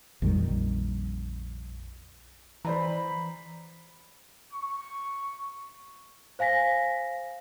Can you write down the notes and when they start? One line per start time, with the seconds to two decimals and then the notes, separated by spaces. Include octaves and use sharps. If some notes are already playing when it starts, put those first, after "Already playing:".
0.22 A#1 F2 D#3 G3
2.65 E3 C5 D5 A#5 B5
4.53 C#6
6.39 C5 F5 G#5 A#6 B6